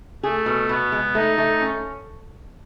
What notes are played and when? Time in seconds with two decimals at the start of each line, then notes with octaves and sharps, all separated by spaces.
0.23 A3 G#4
0.46 B2
0.69 B2 B3
0.92 G#3
1.15 A3 D#4
1.38 A3
1.61 C#4